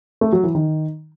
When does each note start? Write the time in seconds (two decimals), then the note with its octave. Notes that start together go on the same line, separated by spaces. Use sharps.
0.21 A3
0.32 F#3
0.44 E3
0.55 D#3